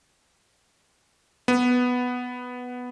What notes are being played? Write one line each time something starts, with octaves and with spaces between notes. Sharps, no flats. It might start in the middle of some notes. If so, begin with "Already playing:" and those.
B3